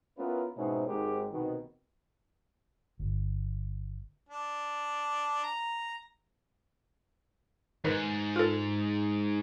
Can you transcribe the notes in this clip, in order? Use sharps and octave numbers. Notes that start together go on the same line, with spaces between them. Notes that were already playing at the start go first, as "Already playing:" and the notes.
B3 C#4 E4 F4 A#4 B4
G#2 B2 C4 C#4 D#4 E4
G#1 G#2 F#3 G#3 G4 A#4
C2 B2 D#3
G1
D4
A#5
G#2 D#3 A#4 B4
F4 A4